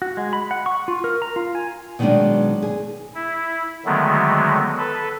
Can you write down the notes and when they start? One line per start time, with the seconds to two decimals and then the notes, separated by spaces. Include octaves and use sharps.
0.02 F#4
0.17 G#3
0.33 B5
0.51 F#5
0.66 C#6
0.88 F4
1.04 A#4
1.22 A#5
1.36 F4
1.55 G#5
1.99 B2 D#3 F#3 G#3 B3 D4
2.62 G#4
3.15 E4
3.85 D3 D#3 F#3 G#3 A3 B3
4.78 A4 B4